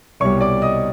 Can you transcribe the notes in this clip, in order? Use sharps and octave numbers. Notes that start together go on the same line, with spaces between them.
C2 B2 G3 C#5 C#6
D5 D6
D#5 D#6